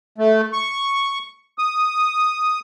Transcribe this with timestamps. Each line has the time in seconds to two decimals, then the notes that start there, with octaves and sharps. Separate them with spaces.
0.18 A3
0.53 C#6
1.58 D#6